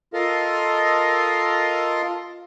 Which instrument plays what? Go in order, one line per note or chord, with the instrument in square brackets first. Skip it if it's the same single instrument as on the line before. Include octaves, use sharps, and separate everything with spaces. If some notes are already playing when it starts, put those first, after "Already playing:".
[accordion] F4 A4 A#4 D#5 F5 C6